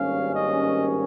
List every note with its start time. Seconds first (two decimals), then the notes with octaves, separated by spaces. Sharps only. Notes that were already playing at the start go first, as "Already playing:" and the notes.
Already playing: G#1 G2 G3 A#3 C#4 F5
0.35 D#5